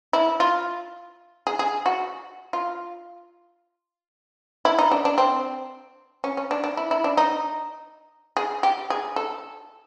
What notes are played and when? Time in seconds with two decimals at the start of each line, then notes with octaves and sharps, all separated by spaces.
0.13 E4
0.40 F4
1.47 G#4
1.59 G#4
1.86 F#4
2.53 F4
4.65 E4
4.79 D#4
4.91 D4
5.05 D4
5.18 C4
6.24 C#4
6.37 C#4
6.51 D4
6.64 D4
6.77 E4
6.91 E4
7.04 D4
7.17 D#4
8.37 G#4
8.63 G4
8.90 G#4
9.16 A4